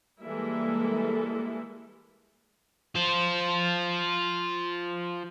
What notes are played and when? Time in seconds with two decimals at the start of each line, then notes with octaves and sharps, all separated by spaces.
0.23 E3 G3 G#3 A#3 E4 A4
2.95 F4 C5